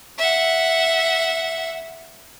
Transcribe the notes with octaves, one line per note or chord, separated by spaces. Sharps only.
E5 F#5